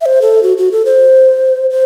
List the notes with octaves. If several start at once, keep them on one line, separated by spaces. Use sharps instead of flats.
E5
C5
A4
F#4
F#4
A4
C5
C5